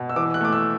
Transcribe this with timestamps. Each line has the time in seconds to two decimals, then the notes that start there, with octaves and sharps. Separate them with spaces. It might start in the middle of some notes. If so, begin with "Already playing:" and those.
Already playing: B2
0.10 E6
0.16 E3 D6
0.34 F#6
0.41 A3 D6
0.53 E6